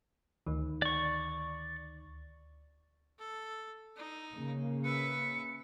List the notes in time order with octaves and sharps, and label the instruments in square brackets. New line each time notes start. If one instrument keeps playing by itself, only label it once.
[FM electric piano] D2 D#3
[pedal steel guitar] D5 C#6
[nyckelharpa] A4
D#4
[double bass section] C#3 A#3
[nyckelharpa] B4 E5 [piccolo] C#7